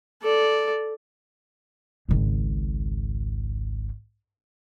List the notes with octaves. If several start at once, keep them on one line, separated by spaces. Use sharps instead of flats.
A4 D5
G#1 C#2